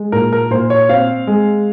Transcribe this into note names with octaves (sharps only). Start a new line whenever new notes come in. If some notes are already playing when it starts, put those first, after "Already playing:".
Already playing: G#3
A#2 A#4
A#4
A#2 C5
C#5
C4 F5
G#3